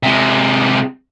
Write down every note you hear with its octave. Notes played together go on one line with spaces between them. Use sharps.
C3 G#3